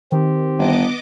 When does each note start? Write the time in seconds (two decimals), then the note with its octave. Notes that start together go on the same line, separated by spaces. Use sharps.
0.12 D#3 C4 G4
0.58 G1 B3 D#5 D6